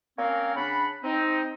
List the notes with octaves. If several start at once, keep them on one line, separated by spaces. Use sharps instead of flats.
A#3 C4 C#4 A#4 C#5 F5
C#3 D4 F#5 B5
C4 D#4